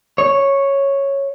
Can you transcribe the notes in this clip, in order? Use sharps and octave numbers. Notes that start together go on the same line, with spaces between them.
C#5